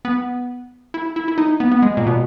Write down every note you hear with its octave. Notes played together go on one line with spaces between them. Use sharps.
B3
E4
E4
E4
D#4
B3
B3
G#3
A#2
B2